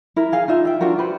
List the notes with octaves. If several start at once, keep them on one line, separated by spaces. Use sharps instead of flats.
E4 A#4
G#4 F5 G#5
D#4 F4 E5
E5 G5
D4 F4 F#4 A#4
G4 B4 C5